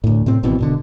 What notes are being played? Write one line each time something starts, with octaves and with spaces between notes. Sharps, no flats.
D2 A2
A2 C3 C4
G#1 B2 E3 C4
D#1 B2 D3